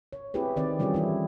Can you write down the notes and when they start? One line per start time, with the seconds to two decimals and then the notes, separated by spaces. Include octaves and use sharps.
0.13 C#5
0.34 C4 E4 G4 G#4 B4
0.56 D#3 C4 D5
0.79 E3 G3 C#4 F4 G4 G#4
0.94 E3 C#4 E4 A4